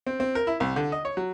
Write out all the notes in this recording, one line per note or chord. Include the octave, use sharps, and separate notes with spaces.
C4
C4
A#4
E4
C2
D3
D#5
C#5
F#3